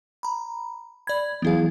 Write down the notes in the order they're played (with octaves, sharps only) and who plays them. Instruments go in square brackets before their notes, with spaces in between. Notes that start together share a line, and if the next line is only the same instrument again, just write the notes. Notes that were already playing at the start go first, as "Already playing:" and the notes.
[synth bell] A#5 B5
[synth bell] D5 G#6 [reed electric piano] B5
[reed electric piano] E3 F#3 G#4 [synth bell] B3 E4 F5